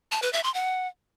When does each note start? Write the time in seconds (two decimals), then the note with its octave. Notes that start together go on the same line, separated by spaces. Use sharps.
0.12 A5
0.22 B4
0.33 E5
0.44 C6
0.54 F#5